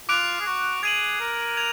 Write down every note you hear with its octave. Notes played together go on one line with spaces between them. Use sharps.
F4 D6 F#6 D7 F7
G#4
F#4
G#4 G#6 D#7 F#7
A#4
G#6 F7